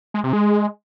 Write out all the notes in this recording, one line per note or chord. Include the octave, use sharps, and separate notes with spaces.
G#3
C3
G#3